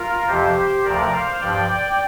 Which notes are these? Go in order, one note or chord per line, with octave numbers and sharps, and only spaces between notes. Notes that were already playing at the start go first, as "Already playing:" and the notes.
Already playing: F4 A#4
F2 C3 F3 G4 C5
D2 C3 F3 A#4 D5
C5 F5
G2 F3 D5 G5